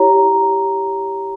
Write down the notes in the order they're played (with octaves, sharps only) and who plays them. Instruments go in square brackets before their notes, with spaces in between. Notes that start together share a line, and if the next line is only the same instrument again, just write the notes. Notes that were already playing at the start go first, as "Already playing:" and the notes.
Already playing: [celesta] E4 G4 C#5 A#5